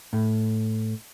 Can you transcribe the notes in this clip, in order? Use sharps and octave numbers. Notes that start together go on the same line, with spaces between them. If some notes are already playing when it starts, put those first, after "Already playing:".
A2